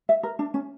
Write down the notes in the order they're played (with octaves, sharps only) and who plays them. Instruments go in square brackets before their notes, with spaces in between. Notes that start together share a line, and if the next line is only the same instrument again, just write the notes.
[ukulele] E5
A#4
D4
C#4